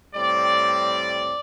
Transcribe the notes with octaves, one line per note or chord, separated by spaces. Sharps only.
A2 G3 C4 D5